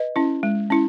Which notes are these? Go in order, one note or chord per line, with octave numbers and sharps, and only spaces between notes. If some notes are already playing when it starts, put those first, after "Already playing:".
Already playing: B4 D#5
C#4 E4
G#3
C#4 E4